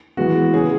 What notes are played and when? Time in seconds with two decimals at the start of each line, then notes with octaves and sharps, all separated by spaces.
0.17 E3 G#3 B3 F#4
0.53 C#3 G#3 C#4 G#4